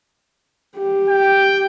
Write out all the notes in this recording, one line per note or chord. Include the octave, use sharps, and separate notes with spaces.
G4
G5